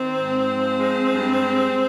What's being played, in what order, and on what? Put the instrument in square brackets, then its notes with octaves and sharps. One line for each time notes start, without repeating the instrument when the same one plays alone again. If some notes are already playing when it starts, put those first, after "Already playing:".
Already playing: [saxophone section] D#3 C4
G#2
F3
G#3
G2
G#3